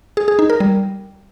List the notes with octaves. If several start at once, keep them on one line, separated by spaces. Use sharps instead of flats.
G#4
G#4
D#4
A#4
G3